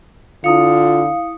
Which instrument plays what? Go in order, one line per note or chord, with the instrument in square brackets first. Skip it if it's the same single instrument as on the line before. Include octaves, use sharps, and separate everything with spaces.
[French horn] D3 [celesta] E4 D#6 C#7 [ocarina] F4 [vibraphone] F5